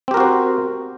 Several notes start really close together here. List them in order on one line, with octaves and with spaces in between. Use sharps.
C4 G4 A#4 F#4 C5